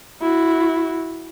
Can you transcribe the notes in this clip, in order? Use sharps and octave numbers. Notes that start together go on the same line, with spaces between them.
E4 F#4